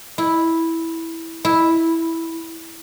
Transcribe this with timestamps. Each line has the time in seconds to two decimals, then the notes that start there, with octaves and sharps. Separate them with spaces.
0.18 E4
1.45 E4